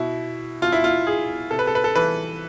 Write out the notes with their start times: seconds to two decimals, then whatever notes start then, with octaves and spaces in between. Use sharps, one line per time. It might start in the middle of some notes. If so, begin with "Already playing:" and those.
Already playing: B2 E4
0.62 B2 F4
0.72 E4
0.84 F4
1.07 G#4
1.51 C3 A4
1.59 B4
1.67 A4
1.75 B4
1.84 A4
1.95 E3 B4